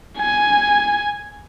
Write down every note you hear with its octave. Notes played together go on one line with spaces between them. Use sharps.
G#5